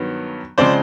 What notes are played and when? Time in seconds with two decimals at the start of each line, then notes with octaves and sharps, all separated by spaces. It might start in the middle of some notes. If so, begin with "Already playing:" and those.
Already playing: G2 D#3 F#3 B3
0.58 C#3 F3 G#3 C4 C5 D5